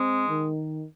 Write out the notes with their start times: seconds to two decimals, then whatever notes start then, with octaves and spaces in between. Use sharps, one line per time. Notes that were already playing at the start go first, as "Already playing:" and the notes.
Already playing: G#3 C4
0.28 D#3